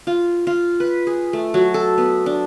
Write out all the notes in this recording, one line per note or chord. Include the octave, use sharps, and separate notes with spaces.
F4
F4
B4
G#4
A3
F#3
A4
B3
D4